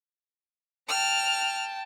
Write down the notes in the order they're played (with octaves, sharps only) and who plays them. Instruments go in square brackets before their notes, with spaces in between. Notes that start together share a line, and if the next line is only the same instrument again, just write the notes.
[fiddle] G5 A5 [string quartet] F6